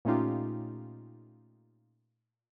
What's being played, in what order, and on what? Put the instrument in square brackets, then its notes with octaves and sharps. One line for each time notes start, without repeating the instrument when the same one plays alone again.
[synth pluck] A#2 A3 C#4 D#4 F4 G4